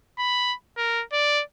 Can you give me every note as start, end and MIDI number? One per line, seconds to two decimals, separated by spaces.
0.19 0.54 83
0.77 1.03 70
1.13 1.42 74